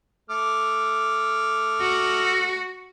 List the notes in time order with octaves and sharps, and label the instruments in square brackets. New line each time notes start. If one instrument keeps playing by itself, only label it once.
[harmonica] A3 D6 F6
[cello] F#4